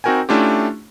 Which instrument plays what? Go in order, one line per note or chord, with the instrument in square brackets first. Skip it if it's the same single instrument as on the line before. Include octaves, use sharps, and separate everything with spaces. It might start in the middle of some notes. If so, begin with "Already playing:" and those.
[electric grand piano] C4 D#4 F#4 A#4 G5 G#5
A3 C#4 D4 E4 F4 G4